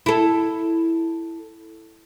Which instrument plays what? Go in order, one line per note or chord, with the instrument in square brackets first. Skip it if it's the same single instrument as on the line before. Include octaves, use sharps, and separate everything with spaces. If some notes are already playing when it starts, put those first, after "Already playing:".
[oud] E4 A4